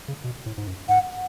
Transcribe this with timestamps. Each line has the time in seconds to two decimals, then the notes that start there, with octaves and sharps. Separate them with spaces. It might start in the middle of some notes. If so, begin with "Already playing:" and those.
0.08 C#3
0.24 B2
0.46 A2
0.57 G#2
0.67 F#2
0.89 G#2 F#5